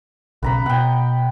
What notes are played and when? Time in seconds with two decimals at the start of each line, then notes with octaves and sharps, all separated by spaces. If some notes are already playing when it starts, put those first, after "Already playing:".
0.43 B1 C#3 B4 A#5 B5
0.66 B2 F#5 G5